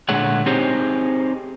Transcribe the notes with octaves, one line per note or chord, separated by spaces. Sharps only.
A#2 D3 G#3 A3 C#5 F#5
C4 D#4 G4 G#4 C5 C#5